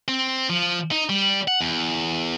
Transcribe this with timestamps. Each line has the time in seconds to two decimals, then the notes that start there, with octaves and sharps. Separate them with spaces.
0.08 C4
0.50 F3
0.92 D#4
1.09 G3
1.48 F#5
1.61 E2